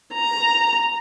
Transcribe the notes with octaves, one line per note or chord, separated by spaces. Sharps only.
A#5